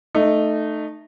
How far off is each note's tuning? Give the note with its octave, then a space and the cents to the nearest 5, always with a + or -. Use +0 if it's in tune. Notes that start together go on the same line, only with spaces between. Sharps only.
A3 +0 D#4 -20